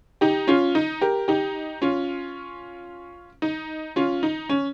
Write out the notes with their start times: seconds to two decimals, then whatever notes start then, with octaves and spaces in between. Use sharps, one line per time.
0.21 D#4 G4
0.47 C#4 F4
0.75 D#4
1.01 G4 A#4
1.28 D#4 G4
1.82 C#4 F4
3.42 D#4
3.96 C#4 F4
4.23 D#4
4.49 C#4